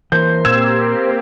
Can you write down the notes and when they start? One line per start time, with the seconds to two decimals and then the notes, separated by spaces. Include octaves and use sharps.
0.12 E3 A#3 A#4 C5 C6 G6
0.45 A#2 A#3 C4 G4 E6 G#6 E7